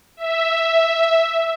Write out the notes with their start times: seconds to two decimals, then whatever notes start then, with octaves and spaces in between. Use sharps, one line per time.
0.17 E5